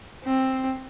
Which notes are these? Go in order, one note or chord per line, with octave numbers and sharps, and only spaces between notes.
C4